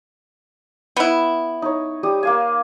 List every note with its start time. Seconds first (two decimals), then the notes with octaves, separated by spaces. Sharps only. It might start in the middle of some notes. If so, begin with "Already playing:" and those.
0.97 B3 E4
1.62 D#4 C#5
2.03 G3 G4 D#6
2.23 A#3 F5 G#5